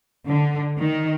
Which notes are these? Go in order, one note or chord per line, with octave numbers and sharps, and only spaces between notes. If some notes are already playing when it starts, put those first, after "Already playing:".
D3
D#3